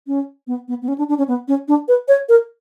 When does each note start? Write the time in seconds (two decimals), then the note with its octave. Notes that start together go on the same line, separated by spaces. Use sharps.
0.07 C#4
0.47 B3
0.68 B3
0.82 B3
0.88 C#4
0.98 D4
1.09 D4
1.18 C#4
1.28 B3
1.48 C#4
1.68 D4
1.88 B4
2.08 C#5
2.29 A#4